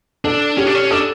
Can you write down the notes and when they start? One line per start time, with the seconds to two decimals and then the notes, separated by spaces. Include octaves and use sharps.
0.24 D4 A4
0.57 C#4 G4
0.66 D4
0.75 C#4
0.91 D4 A4